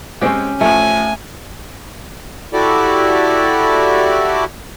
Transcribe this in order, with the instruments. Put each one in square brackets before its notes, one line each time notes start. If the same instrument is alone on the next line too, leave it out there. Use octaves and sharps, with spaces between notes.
[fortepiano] G#3 C4 [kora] C#4 G4
[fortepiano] A1 F3 [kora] A3 [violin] G#5
[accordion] E4 F#4 G4 A4 D5